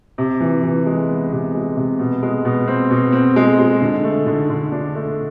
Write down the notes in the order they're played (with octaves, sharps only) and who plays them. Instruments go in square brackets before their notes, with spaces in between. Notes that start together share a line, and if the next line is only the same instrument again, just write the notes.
[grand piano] C3
E3
E3
G#3
B3
C3
G#3
C3
B2
G#3
B2
C4
B2
C4
G#3
G#3
D3
A3
D3
D3
D4
A3